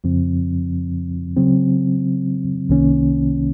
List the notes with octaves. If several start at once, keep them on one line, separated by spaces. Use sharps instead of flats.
F2 C#3 F3 C4
C#3 F#3 C4
C2 C3 D#3 A#3 C#4